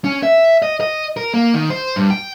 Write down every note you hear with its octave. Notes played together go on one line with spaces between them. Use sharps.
C#4
E5
D#5
D#5
A#4
A#3
D#3
C5
G2
G5